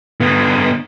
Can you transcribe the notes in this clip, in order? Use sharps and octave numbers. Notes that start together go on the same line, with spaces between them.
D3 B3